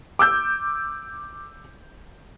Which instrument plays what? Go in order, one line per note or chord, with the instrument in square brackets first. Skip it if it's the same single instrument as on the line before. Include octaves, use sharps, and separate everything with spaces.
[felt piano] D6 E6 G6